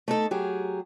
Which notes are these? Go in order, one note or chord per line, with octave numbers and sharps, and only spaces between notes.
A3 D#4 A4
F#3 G4 G#4